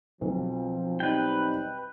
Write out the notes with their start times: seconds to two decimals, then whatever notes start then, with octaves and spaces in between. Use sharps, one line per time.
0.21 B1 F3 C4
1.00 G3 C4 D#4 B4 G5